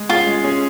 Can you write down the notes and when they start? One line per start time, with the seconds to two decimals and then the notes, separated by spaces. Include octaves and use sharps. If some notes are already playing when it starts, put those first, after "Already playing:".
Already playing: G#3
0.09 C#4 F4 G#4
0.26 G#3
0.44 C#4 G#4